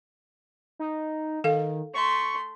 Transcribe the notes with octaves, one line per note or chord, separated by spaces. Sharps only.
D#4
D#3 A4 F5
A3 C6 C#6